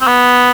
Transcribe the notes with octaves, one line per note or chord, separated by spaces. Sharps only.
C4
B3